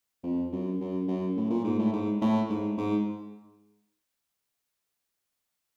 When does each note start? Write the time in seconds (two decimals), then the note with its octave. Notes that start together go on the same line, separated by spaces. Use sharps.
0.24 F2
0.52 F#2
0.80 F#2
1.08 F#2
1.37 A2
1.50 A#2
1.64 G#2
1.79 A2
1.93 G#2
2.22 A2
2.50 G#2
2.77 G#2